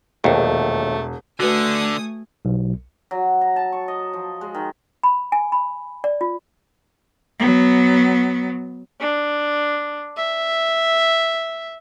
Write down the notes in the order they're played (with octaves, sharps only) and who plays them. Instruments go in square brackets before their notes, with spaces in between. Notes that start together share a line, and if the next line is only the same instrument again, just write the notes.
[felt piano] E1 [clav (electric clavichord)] A#1 D#2 [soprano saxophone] A3
[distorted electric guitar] D3 [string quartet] A3 G#5 D#6 [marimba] F#4 B4
[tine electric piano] B1
[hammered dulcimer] F#3
A#5
A5
C#6
D#5
F3
G#3
D#3
[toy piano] B5
G#5
B5
D5
F4
[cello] F#3 B3
[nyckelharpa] D4
E5